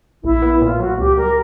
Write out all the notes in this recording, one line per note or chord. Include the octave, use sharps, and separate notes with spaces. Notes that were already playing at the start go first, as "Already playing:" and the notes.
A#1 E4
B3
A#2 F4
F#3 F#4
C#2 G4
G3 A#4